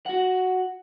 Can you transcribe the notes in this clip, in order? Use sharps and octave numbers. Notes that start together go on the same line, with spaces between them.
F#4 F#5